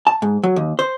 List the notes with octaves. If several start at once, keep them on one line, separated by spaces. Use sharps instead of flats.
A5
G#2
F#3
D#2
C5